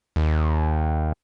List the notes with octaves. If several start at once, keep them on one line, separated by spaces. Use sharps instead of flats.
D#2